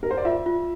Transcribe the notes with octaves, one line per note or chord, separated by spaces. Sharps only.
A#4
C5
D5
F4 E5
F4